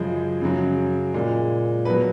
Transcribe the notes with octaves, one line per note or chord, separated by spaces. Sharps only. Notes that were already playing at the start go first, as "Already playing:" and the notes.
Already playing: F#2 C#3 F3 G#3 G#4
F#2 C#3 F#3
A#2 G#3
B2 F#3 B4